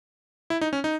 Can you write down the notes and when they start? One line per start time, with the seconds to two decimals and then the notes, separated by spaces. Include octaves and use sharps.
0.50 E4
0.61 D#4
0.73 C#4
0.84 D#4